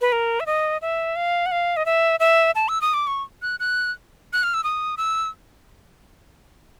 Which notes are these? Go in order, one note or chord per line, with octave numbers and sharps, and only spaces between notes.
B4
A#4
E5
D#5
E5
F5
F#5
F5
D#5
E5
E5
A5
E6
D#6
D6
C#6
F#6
F#6
F#6
F6
E6
D#6
E6